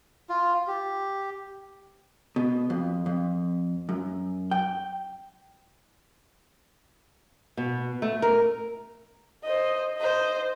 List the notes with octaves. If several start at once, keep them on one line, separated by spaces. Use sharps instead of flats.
F4
G4
B2
F2
F2
F#2
G5
B2
A3
A#4
C5 D#5
C5 D#5